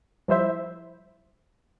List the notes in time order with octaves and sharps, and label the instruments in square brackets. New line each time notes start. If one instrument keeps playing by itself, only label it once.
[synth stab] F3 G3 E4 C5 E5